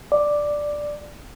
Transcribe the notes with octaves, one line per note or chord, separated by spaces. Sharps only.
D5